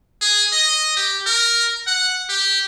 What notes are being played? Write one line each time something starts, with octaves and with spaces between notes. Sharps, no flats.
G#4
D#5
G4
A#4
F#5
G4